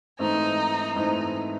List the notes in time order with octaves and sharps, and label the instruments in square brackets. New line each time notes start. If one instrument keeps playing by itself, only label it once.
[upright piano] G#2 E3 A3 C4 E4 [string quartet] D#4
[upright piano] G#2 E3 A3 C4 E4 [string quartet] D#4